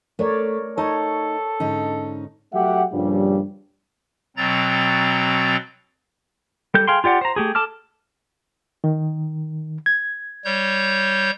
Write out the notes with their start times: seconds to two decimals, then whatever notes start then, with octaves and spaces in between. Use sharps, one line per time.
0.19 A3 A#4 C#5 D5
0.78 D#4 A4 C#5 A5
1.60 G#2 D3 C#4 D#4
2.53 F#3 A3 G4 E5 F#5
2.92 G2 A#2 C#3 F3 G3
4.37 B2 F#3 C4 A#5 A6
6.74 G3 A4 G6
6.88 G#4 F5 G5 C6
7.04 F4 G4 D5 F#5
7.21 C5 A#5
7.36 A3 G4 G#4
7.55 A4 A5 D6 F6
8.84 D#3
9.86 G#6
10.45 G3 C#5 G6